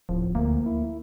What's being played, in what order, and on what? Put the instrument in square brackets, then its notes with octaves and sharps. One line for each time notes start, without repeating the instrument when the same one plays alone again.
[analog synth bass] D1 [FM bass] F3
[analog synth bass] D2 [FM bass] A#3
[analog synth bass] E4